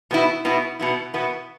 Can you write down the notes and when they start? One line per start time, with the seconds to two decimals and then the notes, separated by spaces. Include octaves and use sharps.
0.11 B2 B3 E4
0.45 B2 B3 E4
0.79 B2 B3 E4
1.14 B2 B3 E4